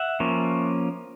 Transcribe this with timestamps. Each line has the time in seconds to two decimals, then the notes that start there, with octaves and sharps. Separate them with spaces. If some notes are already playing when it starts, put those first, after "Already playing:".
Already playing: E5 F#5
0.20 F3 A#3 C#4